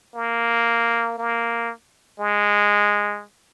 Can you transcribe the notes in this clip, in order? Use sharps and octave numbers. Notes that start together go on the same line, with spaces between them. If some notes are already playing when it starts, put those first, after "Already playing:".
A#3
A#3
G#3